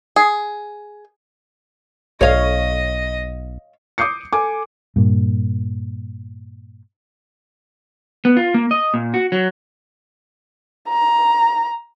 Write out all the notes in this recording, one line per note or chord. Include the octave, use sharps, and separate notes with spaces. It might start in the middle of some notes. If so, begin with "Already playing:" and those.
G#4
B1 C#5 D#5 F5
D6 D#6 G6 C7 C#7
A4 G#5 D6
G2 A#2
B3
F4
A#3
D#5
A#2
F#4
F#3
A#5